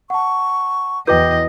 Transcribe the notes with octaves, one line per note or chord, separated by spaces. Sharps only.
F#5 A5 C#6
E2 E4 F#4 B4 D#5 G5 D6 G6